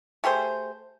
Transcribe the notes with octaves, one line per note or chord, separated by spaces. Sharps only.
A3 G4 G#4 C5